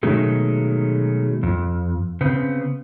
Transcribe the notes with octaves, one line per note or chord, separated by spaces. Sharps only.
B2 D#3 F#3 G#3 A3
F2
C#3 B3 C4